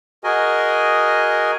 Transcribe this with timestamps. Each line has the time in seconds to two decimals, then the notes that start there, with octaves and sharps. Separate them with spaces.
0.24 F#4 G#4 A#4 D#5 G#5